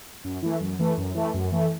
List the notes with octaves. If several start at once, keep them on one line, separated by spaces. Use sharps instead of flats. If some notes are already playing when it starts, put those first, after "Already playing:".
F#2
E3 A3
F#2
E3 A3
F#2
E3 A3
F#2
E3 A3